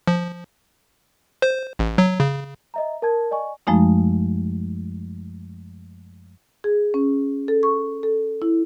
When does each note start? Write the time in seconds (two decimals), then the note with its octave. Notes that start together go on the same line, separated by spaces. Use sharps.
0.07 F3
1.42 C5
1.79 A1
1.98 F#3
2.20 C#3
2.74 D#5 E5 A#5
3.02 A#4 A5 G#6
3.31 D5 D#5 G#5 C#6
3.67 F#2 F3 G#3 A3 D#4
6.64 G#4
6.94 C#4
7.48 A4
7.63 C#6
8.03 A4
8.42 E4